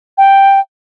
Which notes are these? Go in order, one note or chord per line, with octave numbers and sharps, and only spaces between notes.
G5